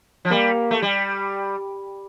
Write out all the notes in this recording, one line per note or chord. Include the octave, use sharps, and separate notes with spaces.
F3
G3 A#3
A3
G3